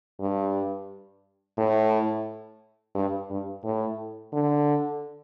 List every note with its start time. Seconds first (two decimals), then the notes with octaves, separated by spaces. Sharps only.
0.20 G2
1.58 A2
2.95 G2
3.30 G2
3.64 A2
4.33 D3